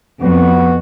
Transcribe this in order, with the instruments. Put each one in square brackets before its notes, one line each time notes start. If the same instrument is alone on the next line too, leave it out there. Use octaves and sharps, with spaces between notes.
[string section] F2 [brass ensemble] B3 F#4